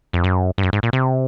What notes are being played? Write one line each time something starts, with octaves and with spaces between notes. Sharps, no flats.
F2
F#2
G2
F#2
G#2
A#2
C3